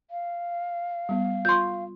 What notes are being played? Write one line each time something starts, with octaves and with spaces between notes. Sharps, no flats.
F5
G3 B3
F4 C6 C#6 G6